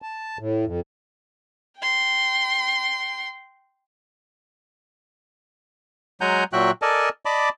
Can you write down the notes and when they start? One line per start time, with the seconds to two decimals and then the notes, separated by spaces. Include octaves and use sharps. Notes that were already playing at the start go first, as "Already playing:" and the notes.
0.02 A5
0.39 A2
0.65 F2
1.78 G5 C6
6.21 F#3 G#3 F#5 G#5 A#5 G6
6.53 A#2 F#3 F#4 E5 G5 F#6
6.82 A4 A#4 D5 D#5 G#5 A5
7.25 D5 D#5 A5 B5 D6